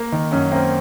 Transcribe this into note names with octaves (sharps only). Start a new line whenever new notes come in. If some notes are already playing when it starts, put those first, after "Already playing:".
Already playing: A#3
D#3
F#2 C#4
A#3 C4